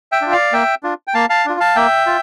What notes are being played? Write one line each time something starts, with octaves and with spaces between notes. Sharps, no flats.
E5 G5
D4 F4
D5 F5
A#3 E5 G5
D4 F4
G5
A#3 F5 A5
F5 A5
D4 F4
F5 A5
A#3 E5 G5
F4